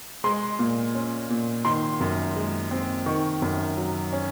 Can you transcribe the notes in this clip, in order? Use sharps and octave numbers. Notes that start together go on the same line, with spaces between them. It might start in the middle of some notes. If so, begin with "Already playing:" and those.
G#3 C6
A#2
C#4
A#2
D#3 C6
F#2
G#3
C4
D#3 C#6
F#2
F#3
C#4